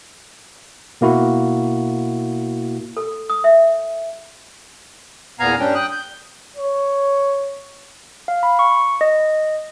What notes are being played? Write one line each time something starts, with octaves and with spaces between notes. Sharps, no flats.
B2 A#3 E4 F#4
A4
D#6
E5
E2 A#2 B3 F5 G#5 A#5
G2 G3 C#4 D4 G5
G5 D#6 F#6
G6
C#5
F5
B5
C#6
D#5